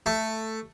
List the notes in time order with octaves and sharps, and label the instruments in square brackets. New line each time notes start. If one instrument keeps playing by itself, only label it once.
[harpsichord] A3